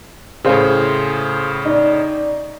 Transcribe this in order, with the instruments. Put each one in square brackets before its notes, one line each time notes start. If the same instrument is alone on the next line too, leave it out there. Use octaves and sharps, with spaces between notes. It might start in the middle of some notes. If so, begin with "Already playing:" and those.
[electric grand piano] A2 C#3 [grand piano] G#4 C5 F5
[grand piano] D#4 D5